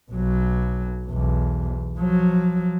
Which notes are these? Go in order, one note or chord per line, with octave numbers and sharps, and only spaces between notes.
B1 F#3
B1 E2
F3 F#3